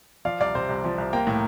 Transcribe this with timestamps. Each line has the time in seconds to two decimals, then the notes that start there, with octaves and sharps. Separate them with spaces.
0.25 F3 D5 F5
0.40 C2 D5 F5
0.55 C3 C5
0.69 C2
0.84 F3
0.98 C2
1.13 A#3 G5 A#5
1.27 A2